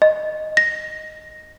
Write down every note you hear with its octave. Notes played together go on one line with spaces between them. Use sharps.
D#5
A#6